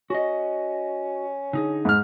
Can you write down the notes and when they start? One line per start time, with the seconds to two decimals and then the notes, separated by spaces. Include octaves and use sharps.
0.10 C#4 F#4 D#5
1.53 D3 D#4 G#4
1.85 G#2 F6